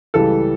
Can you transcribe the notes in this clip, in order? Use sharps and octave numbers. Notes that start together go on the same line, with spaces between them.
C#2 C#3 E3 G3 A4